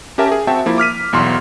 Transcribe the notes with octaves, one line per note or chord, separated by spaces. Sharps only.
C#4 G4 A#4 E5 A5
G#4
C4 F#4 E5 G5 A5
F3 A#3 E4
D6 F6 B6 D#7
B1 E2 F#3 C6